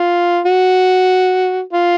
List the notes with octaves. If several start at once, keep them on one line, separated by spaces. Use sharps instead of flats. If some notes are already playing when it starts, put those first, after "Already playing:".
Already playing: F4
F#4
F4